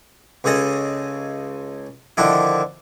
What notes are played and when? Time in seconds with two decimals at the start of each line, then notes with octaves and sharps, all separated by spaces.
0.44 C#2 C#3 G#4 A4 D#5
2.17 D3 D#3 F3 D4 E4